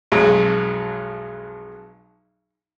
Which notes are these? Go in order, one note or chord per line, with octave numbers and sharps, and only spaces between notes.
B1 F2 F#3 G#3